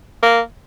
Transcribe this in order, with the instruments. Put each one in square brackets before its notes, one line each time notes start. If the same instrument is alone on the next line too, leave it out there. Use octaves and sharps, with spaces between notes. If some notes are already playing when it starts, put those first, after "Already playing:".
[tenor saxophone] A#3